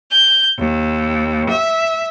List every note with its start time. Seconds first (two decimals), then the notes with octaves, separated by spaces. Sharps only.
0.12 G6
0.59 D#2
1.49 E5